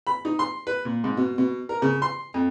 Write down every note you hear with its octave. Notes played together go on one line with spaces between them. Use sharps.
B5
D#4
C6
B4
A#2
G#2
B2
B2
A#4
C#3
C6
F2